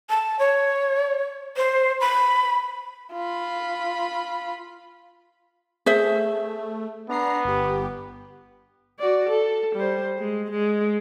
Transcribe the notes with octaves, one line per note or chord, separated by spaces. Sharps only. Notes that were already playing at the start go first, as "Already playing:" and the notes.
A5
C#5
C5
B5
F4 B5
A3 G#4 C5 E5
B3 D4 A#5 C7
G1 G4
F#4 D5
A4
G3 C5
G#3
G#3